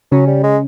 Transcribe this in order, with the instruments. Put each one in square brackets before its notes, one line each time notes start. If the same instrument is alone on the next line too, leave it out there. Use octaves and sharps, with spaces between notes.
[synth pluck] C#3 C#4 [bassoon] F#3
[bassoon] G3
G#3